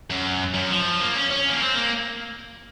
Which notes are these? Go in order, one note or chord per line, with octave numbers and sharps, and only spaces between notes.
F#2
F#2
F3
A#3
C#4
C#4
A#3
C4
A#3